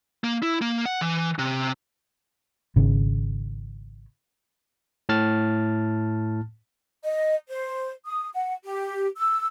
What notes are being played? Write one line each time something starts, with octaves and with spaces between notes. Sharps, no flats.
A#3
E4
A#3
F#5
E3
C3
G#1 C#3
A2 A5 F6 A6
D#5
C5
D#6
F#5
G4
E6